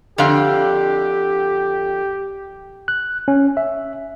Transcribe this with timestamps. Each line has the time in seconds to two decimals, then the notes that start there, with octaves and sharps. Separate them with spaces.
0.18 F2 D3 G4 F5
2.88 F#6
3.28 C#4
3.57 E5